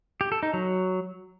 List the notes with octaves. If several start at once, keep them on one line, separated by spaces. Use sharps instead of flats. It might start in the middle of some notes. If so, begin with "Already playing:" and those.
G4
A4
D#4
F#3